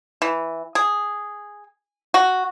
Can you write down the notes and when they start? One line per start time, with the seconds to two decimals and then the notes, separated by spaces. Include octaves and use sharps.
0.22 E3
0.75 G#4
2.14 F#4